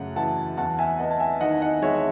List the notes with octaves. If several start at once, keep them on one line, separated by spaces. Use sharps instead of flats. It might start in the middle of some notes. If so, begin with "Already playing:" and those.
Already playing: F#2 C#3 A3 F#5
E3 F#5 A5
E2 F#5 A5
E5 G#5
B3 D#5 F#5
A5
E5 G#5
D#3 D#5 F#5
D#5 F#5
G#3 C#5 E5
E5